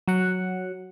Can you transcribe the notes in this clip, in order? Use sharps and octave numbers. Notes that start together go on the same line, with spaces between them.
F#3 F#5